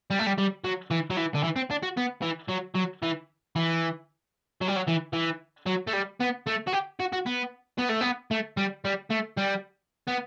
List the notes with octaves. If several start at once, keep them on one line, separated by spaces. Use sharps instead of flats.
G3
A3
G3
G3
F#3
E3
F#3
E3
D3
E3
C4
D4
F#4
B3
E3
F#3
F#3
E3
E3
F#3
G3
F#3
E3
E3
F#3
A3
G3
B3
A3
F#4
G4
F#4
F#4
B3
B3
A3
B3
A3
G3
G3
A3
G3
B3